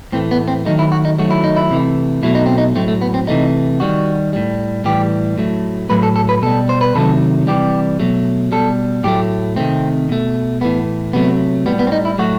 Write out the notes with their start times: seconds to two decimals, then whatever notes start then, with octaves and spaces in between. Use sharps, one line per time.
0.12 A2 E3 A3 C4
0.31 B3
0.48 C4
0.65 D#3 F#3 A3 D#4
0.79 E4
0.92 F#4
1.05 D#4
1.18 D#3 F#3 A3 F#4
1.30 E4
1.44 D#4
1.56 E4
1.71 C3 E3 A3
2.23 B2 F#3 A3 E4
2.35 D#4
2.46 C4
2.58 D#4
2.75 A2 F#3 A3 C4
2.88 A3
3.01 B3
3.14 C4
3.27 C3 E3 A3 D#4
3.80 D#3 G3 F#4
4.33 A2 G3
4.84 A2 E3 G3 G4
5.38 A2 F#3 A3
5.89 A2 F#3 A3 B4
6.03 A4
6.16 A4
6.29 B4
6.42 B2 G3 A4
6.69 C5
6.81 B4
6.95 C3 D#3 F#3 A3 A4
7.47 C3 E3 G3 G4
8.00 B2 F#3 A3
8.52 B2 G3 A4
9.04 A2 F#3 A3 G4
9.56 C3 D#3 A3 C4
10.09 B2 A3
10.61 A2 E3 A3 B3
11.13 C3 F#3 A3 B3
11.66 A2 G3 B3
11.79 B3
11.87 C4
11.92 D#4
12.05 E4
12.18 A2 F#3 A3 F#4